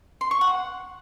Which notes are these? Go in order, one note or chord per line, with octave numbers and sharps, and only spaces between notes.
C6
C#6
F#5